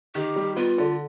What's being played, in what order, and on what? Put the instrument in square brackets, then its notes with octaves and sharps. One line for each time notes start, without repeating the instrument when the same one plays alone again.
[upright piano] D#3 [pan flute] G4
[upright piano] G3
[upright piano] B3 [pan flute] F4
[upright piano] D3